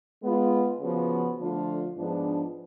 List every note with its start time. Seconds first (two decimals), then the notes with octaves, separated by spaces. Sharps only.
0.22 G#3 B3 F4
0.80 C#3 F3 B3 F#4
1.39 D3 F3 A3 D4 F4
1.97 G#2 F3 B3 D4 G#4